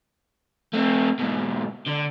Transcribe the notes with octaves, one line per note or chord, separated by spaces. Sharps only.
A3 C4
G#2 B2
D3